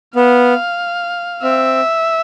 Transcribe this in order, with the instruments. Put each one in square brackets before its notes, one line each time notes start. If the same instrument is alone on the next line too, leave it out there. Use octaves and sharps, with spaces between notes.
[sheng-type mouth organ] B3 [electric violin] F5
[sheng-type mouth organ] C4 [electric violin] E5